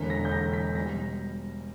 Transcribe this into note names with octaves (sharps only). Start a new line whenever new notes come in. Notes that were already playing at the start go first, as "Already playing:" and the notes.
Already playing: E1 E2 D3 A#3 B6
A#6
G6
A#6
B6
B2 G3 A#6